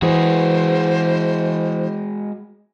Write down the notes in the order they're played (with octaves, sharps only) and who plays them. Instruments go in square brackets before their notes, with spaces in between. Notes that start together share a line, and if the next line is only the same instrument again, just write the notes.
[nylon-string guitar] E3 B3 G#4 [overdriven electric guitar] G#3 F#4 [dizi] C5